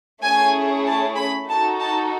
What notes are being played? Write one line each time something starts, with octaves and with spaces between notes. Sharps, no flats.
A3 C#4 E4 G#4 G#5
A5
B5
D#4 F#4 A4 A5
A5